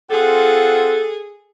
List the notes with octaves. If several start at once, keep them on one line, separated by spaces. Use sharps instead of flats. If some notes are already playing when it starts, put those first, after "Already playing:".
C4 F4 G#4 A4 F#5